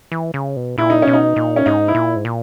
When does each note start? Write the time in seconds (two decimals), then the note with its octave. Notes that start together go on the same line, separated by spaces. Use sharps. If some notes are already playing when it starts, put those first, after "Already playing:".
0.12 E3
0.34 C#3
0.56 B2
0.78 A#2 E4
0.90 D#4
1.02 C#4
1.07 B2
1.13 D#4
1.36 A#2
1.56 C#4
1.66 G#2 D#4
1.88 E4
1.95 A#2
2.16 G#2
2.25 A#2